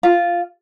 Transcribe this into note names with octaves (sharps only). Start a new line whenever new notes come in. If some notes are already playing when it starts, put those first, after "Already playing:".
F4